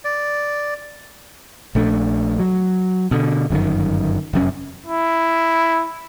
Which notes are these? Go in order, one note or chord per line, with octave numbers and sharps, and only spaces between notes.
D5
A#1 A3 D4
F#3
B2 D3
G1 F#2 C3 D#3
F1 F#2 C#4
E4